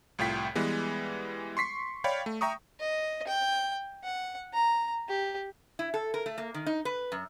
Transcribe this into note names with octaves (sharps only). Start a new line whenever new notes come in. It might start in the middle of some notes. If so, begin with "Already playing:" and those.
C2 A2 F4 G5 B6
E3 G3 G#3 B3
C6 C#6 B6 C7
C#5 D5 F5 G5 B5
A3
E5 G5 A#5 C#6 D#6
D#5
G5
F#5
A#5
G4
E4
A4
A#4
A3
A#3
D#3
D#4
B4
F#2